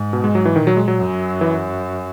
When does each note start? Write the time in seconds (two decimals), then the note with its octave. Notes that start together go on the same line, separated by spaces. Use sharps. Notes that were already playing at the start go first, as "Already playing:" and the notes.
Already playing: G#2
0.13 B2
0.24 G#3
0.35 F#3
0.45 E3
0.56 A#2 D#3
0.67 F#3
0.77 G#3
0.88 F#3
0.99 F#2
1.41 E3